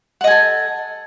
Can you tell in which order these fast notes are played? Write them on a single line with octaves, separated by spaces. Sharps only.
F#5 D#5 G#5 A4